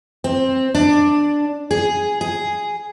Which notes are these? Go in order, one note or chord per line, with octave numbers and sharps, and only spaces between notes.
C4
D4
G#4
G#4